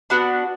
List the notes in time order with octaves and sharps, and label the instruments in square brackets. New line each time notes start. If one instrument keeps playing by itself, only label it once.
[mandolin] B3 D4 F#4